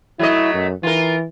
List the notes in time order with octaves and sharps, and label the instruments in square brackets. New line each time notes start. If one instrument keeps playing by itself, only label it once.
[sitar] F#3 A3 D#5 [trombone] E4
[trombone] F#2
[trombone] E3 [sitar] F4 A#4